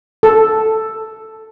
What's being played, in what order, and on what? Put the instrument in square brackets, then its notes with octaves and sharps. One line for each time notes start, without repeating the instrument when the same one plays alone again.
[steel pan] A4